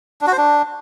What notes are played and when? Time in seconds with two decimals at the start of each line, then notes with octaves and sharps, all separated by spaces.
0.21 D4
0.27 F#4
0.32 C5
0.38 D4